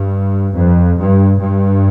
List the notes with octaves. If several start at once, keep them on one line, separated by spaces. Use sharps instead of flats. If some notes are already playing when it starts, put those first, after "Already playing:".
Already playing: G2
F2
G2
G2